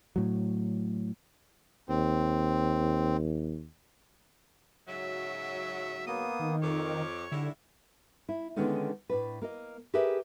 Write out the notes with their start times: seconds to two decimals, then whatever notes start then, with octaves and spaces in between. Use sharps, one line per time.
0.16 A2 F#3
1.89 D#2 C4
4.88 G#2 C#3 F#3 E5
6.07 A#3 B3 D#6
6.39 D#3
6.62 F2 C#5 D6
7.32 G#2 D3 G3 E4
8.29 E4
8.56 D3 D#3 G#3 B3 C#4 D#4
9.10 A2 D4 B4
9.42 A#3 A#4 D#5
9.94 G4 G#4 A#4 B4 E5